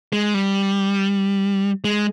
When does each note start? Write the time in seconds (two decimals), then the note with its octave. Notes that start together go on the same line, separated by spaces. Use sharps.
0.13 G#3
0.34 G3
1.84 G#3